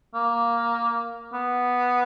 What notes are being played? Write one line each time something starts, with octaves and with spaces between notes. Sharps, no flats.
A#3
B3